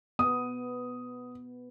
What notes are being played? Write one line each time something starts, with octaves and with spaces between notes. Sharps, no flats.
B3 D#6